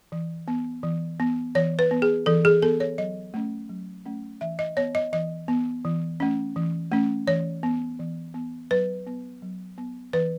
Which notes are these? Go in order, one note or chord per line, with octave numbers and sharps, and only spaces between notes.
E3
B3
E3
B3
E3 C#5
B4
B3
G#4
E3 A4
G#4
B3 A4
C#5
F#3 D#5
A3 C#4
F#3
A3 C#4
E3 E5
D#5
B3 C#5
D#5
E3 D#5
B3
E3
A3 C#4
E3
A3 C#4
E3 C#5
B3
E3
B3
F#3 B4
B3
F#3
B3
E3 B4